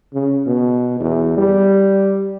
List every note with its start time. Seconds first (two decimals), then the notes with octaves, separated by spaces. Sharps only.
0.14 C#3
0.46 B2
1.00 E2
1.37 G3